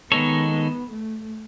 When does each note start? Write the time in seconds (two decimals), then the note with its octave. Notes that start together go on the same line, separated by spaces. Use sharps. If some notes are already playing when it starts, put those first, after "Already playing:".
0.11 D#3 G#3 B3 D#4 A4 C#5
0.51 B3
0.90 A3